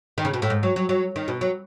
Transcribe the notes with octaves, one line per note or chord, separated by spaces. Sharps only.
D#3
C#3
B2
A2
G#2
F#3
F#3
F#3
D#3
B2
F#3